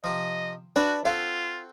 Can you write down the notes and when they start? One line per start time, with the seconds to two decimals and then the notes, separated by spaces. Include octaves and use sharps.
0.04 C3 F3 D#5
0.76 D4 F#4 B4 D5 E5
1.05 C4 F4 F#4 A4 F5